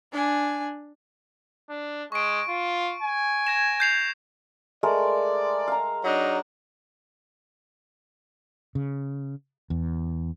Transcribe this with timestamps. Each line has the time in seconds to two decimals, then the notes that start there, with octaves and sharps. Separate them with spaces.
0.12 D4 G#5
1.69 D4
2.12 G#3 C#6 D7
2.48 F4
3.03 G#5
3.47 G#6 A#6 E7
3.80 G6 C7 F7
4.83 G#3 A3 A#4 D5
5.68 F5 A#5
6.04 F#3 D4 D#4
8.75 C#3
9.70 E2